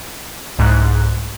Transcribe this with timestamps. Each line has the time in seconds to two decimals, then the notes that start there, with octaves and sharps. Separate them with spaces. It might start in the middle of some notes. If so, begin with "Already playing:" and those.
0.59 C2 G#2 F#6